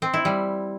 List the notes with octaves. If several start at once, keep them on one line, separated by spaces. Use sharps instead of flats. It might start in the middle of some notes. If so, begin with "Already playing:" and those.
C4
E4
G3